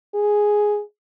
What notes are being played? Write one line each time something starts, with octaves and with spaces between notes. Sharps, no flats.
G#4